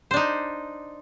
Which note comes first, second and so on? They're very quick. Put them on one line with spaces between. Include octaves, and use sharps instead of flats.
C5 D4 D#4